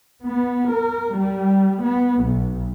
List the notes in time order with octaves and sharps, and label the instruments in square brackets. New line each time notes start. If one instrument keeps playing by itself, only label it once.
[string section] B3
A#4
G3
B3
B1